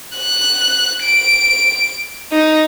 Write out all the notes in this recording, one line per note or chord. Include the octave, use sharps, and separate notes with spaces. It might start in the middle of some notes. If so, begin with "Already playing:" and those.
F#6
D7
D#4